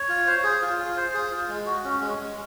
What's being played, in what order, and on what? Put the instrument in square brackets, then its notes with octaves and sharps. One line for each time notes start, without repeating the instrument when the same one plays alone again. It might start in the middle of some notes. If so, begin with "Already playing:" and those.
Already playing: [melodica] C#5
F4
C5
G#4
F4
F4
C5
G#4
F4
G#3
F#4
C#4
G#3
G#3